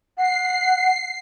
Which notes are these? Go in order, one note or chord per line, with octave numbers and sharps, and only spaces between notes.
F#5 C7